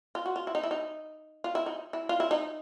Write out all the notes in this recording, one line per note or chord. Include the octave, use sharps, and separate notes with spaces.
F4
F#4
F4
E4
D#4
E4
D#4
F4
E4
D#4
E4
F4
E4
D#4